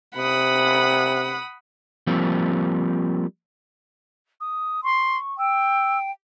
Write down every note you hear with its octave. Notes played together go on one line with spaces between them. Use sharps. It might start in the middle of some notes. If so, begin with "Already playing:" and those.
C3 F#5 B5 D#6
F3 G3 A#3 C4
D#6
C6 C#6
G5 E6